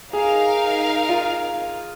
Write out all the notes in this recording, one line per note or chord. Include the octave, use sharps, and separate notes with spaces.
D#4 G#4 A#4 F5
F4